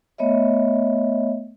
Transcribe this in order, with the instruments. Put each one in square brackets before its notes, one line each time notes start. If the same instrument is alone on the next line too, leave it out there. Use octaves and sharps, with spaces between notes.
[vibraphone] A3 B3 C#5 D#5 E5